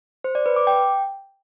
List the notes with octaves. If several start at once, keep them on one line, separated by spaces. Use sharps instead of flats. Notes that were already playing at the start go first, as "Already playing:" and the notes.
C5
D5
B4
D6
G5